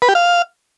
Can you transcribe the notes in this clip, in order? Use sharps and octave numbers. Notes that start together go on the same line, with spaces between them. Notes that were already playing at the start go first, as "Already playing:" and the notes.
B4
G4
F5